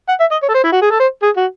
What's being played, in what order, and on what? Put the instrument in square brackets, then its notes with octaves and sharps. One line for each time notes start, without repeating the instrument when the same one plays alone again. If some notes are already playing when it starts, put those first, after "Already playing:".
[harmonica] F#5
E5
D#5
C#5
A4
C5
E4
F#4
G#4
A4
C5
G#4
F#4